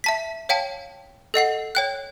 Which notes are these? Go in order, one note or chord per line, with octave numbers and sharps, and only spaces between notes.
E5 A5 B6
C#5 F5 G5 A5
A4 D#5 F#5 C7
C#5 G5 F#6